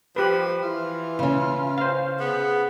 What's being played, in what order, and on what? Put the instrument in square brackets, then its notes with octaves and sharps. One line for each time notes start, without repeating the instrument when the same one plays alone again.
[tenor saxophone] F3 [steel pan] G4 B4
[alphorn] E3 [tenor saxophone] F4
[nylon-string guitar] C#3 C#4
[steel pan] C5 F5
[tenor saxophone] B3 [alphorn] G#4